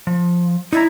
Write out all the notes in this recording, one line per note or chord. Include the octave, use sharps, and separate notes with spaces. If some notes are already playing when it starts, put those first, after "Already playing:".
F3
D#4 E4 D5 A#5